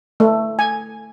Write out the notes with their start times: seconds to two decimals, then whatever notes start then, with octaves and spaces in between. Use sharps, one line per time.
0.20 A3
0.59 G#5